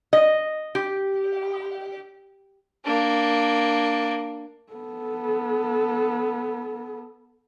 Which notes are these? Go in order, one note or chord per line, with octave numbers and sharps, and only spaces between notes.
D#5
G4
A#3 D4
B3 A4